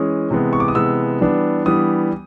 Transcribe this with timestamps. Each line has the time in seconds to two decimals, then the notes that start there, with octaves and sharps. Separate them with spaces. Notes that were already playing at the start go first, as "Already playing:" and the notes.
Already playing: E3 G#3 C#4 D#6
0.31 C3 E3 G#3 B3
0.53 C#6
0.60 D6
0.68 D#6
0.75 C3 E3 G#3 B3 E6
1.21 E3 G3 B3 D4
1.65 E3 G3 B3 D4 D#6